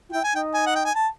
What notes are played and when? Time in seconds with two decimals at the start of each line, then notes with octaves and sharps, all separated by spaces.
0.09 F4
0.13 E4 G5
0.24 G#5
0.34 D#4 G5
0.54 G#5
0.66 F#5
0.76 G5
0.85 G#5
0.95 A5